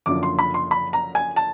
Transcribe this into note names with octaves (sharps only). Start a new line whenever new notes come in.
F#1 F#2 D3 F3 D6
C6
B5
C6
B5
A#5
G#5
A5